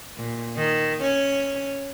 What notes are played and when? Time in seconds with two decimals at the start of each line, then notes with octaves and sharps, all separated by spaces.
0.17 A#2
0.56 D#3
1.01 C#4 C#5